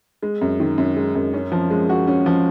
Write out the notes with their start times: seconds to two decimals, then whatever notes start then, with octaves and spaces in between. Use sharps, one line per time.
0.23 G#3
0.41 F#2
0.60 D#3
0.78 F#2
0.97 G#3
1.15 F#2
1.34 C#4
1.52 F3
1.70 G#3
1.89 F#4
2.07 C#4
2.26 F3